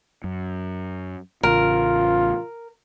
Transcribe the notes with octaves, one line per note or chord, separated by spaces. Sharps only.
F#2
A1 C#3 F4 A#4